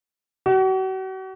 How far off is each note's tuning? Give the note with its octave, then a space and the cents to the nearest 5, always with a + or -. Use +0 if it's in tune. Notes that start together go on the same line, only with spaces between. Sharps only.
F#4 +40